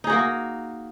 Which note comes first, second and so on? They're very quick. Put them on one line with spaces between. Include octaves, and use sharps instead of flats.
D#4 G#4 F#4 A#3